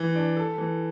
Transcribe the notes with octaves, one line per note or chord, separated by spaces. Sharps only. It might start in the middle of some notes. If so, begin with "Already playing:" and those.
Already playing: E3
D4
A4
E3